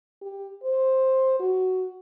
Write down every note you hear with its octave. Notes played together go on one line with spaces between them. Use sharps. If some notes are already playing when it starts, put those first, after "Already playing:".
G4
C5
F#4